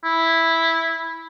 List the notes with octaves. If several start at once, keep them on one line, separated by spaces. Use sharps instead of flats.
E4